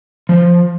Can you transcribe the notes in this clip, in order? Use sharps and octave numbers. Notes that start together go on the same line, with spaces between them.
F3